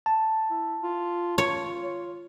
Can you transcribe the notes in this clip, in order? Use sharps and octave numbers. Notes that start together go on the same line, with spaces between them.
A5
E4
F4
F4 C#5